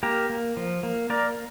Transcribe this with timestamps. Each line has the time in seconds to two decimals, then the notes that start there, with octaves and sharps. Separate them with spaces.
0.03 A#3 G4 A#4
0.30 A#3
0.57 F3
0.83 A#3
1.10 A#3 A#4 D5